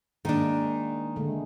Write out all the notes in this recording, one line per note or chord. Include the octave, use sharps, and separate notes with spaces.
D#3 G#3 A#3 D4
D3 G#3 A3